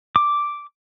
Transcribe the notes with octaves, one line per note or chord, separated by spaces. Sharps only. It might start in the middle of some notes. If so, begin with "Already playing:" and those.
D6